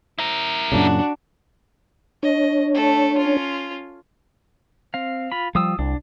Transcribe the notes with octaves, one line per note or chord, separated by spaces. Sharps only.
E4 A#4
F#2 A#2 C#3 D4 F#4
D4 C#5 D#5
A3 A4
C#4 F4
C4 F5
F4 B5
F3 G3 F4 D#6 E6
C2 D4